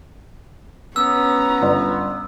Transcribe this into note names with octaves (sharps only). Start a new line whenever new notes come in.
B3 C#4 A#5 E6
G1